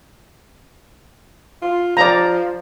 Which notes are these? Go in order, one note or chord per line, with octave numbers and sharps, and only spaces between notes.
F4
F3 D5 A#5